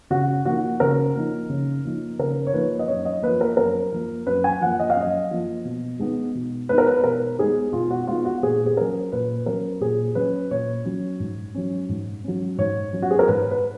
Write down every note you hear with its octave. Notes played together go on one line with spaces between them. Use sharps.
C#3 F#4
F3 A#3 D#4 F#4
C#3 A#4
F3 A#3 D#4
C#3
F3 A#3 D#4
C#3 A#4
C#5
F3 A#3 D#4 B4
D#5
F#2 C#5
D#5
F3 A#3 B4
A#4
F#2 A#4
F3 A#3
F#2 B4
G#5
F3 A#3 F#5
D#5
F5
F#2
D#5
F3 A#3
B2
G#3 B3 D#4
B2
G#3 B3 D#4 B4
A#4
B4
B2 A#4
G#3 B3 D#4 G#4
B2 F4
F#4
G#3 B3 D#4 F4
F#4
A#2 G#4
G#4
F#3 C#4 A#4
A#2 B4
F#3 C#4 A#4
A#2 G#4
F#3 C#4 B4
A#2 C#5
F#3 C#4
G#2
F#3 C#4
G#2
F#3 C#4
G#2 C#5
F#3 C#4
F#4
G#4
A#4
G#2 B4
B4